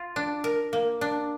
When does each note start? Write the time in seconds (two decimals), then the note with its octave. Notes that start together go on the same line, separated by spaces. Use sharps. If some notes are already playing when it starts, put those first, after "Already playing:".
Already playing: F4
0.16 D4
0.44 A#4
0.73 A#3
1.01 D4